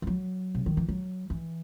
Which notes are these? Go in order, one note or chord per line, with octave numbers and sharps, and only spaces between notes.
E3
F#3
C3
D#3
E3
F#3
E3